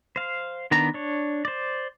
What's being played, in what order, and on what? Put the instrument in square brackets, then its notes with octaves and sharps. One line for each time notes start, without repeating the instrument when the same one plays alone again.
[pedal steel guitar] C5 F5
D#3 B3 D4 A#5
D4 C#5
C5 D5